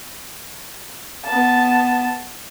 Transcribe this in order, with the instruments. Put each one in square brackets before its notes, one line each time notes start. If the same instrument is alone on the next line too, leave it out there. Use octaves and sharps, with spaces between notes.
[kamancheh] B3 A5